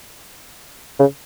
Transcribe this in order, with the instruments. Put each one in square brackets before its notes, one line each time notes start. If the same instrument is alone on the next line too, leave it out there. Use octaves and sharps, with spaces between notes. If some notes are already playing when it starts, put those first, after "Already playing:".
[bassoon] C#3